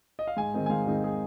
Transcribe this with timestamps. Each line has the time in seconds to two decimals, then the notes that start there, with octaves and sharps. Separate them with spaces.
0.19 D#5
0.27 F5
0.37 G#2 G#5
0.54 D#3 G#3 C4 D#4
0.66 G#5
0.70 G#2 F5
0.86 D#3 G#3 C4 D#4
1.04 G#4